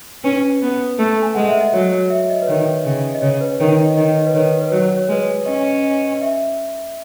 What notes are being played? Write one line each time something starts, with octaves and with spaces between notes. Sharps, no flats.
C#4 B4
B3
A3
G#5
G#3 F#5
E5
D#5
F#3 C#5
C#5
E5
D#5
B4
D#3 C#5
C#3
D#5
C#3 C#5
B4
D#3 C#5
D#5
D#3 D#5
B4
D#3 C#5
B4
F#3 C#5
C#5
G#3 B4
C#5
C#4 D#5
D#5
E5